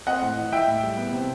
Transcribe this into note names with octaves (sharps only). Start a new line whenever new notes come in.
C4 D#5 F#5
A2
E3
E4 E5 G5
A2
G3
B3
C3